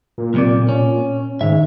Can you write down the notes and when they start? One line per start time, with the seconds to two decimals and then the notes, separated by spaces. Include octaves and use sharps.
0.18 A#2
0.34 B1 C3 D5
0.69 C#4
1.41 G#2 D#3 E5